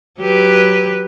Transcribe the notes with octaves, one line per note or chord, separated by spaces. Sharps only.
F#3 G4 B4